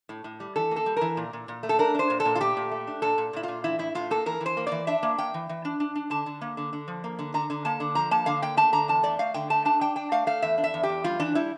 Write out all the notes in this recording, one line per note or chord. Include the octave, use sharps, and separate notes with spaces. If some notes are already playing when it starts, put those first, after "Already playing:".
A2
A2
G3
E3 A4
A#3
A4
G3
E3 A#4
A#2
A#2
A#2
A3
A4
D4 A#4
D4 C5
A#2
A4
A#2
F4
A3 G4
A#2
A3
D4
A#2 A4
A#2
A#2 E4
A#2 F4
E3 E4
A2 E4
A2 F4
A#3 A4
E3 A#4
E3
C5
A#3
E3 D5
D4 E5
A#3
A#3 G5
E3
E3
D4
D4
D4
D3 A5
D3
A#3
D3
D3
F3
A#3
D3
D3 A#5
D3
A#3 A5
D3
F3 A#5
A#3 A5
D3 F5
A#3 G5
A3 A5
D3 A#5
E2 A5
A3 D5
A3 F5
D3 G5
A3 A5
D4 A5
D4 G5
D4 G5
A3 F5
A3 F5
E2 E5
D4
E5
E2
G4
E2
G3 F4
E3 D4
G3 E4